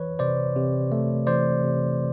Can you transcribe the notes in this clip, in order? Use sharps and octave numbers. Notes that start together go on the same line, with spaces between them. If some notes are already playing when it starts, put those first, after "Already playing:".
Already playing: E3 B4 C#5
C3 C5 D5
C3
A3
E3 C5 D5
C3